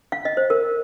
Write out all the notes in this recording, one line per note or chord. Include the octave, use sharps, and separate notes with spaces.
F5
D#5
C5
A#4